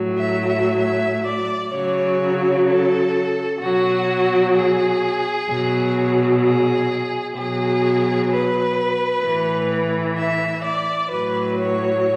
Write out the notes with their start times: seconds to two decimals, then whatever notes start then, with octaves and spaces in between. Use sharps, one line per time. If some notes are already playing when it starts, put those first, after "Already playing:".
Already playing: A2 F#3
0.18 E5
0.49 E5
0.80 E5
1.27 D5
1.74 C#3 F#3 C#5
2.67 A4
3.61 B2 F#3 F#4
4.55 G#4
5.49 B2 F#3
6.43 G#4
7.36 B2 F#3 G#4
8.31 B4
9.24 A2 E3
10.17 E5
10.65 D5
11.11 A2 F#3 B4
11.59 C#5